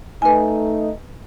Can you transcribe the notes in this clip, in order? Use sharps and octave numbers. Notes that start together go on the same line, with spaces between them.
A3 D#4 B4 G#5